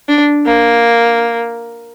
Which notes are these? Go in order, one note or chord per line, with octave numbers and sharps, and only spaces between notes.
D4
A#3